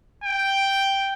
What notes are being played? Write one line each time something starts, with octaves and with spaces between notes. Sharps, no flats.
G5